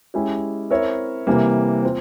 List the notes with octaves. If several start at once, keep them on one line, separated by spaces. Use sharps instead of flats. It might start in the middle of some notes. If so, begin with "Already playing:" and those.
G#3 C#4 E4 G4
C4 E4 A#4 C#5 E5
C3 E3 G3 A#3
C4 F4